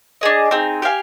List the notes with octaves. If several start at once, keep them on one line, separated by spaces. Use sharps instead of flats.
D4 G#4 D#5
C4 D#4 G#4
G4 D5 F5 G#5